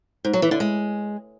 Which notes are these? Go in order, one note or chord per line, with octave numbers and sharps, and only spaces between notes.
G#2
F#3
E3
D3
G#3